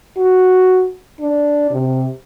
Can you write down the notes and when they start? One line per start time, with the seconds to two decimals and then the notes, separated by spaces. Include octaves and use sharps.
0.17 F#4
1.21 D4
1.71 C3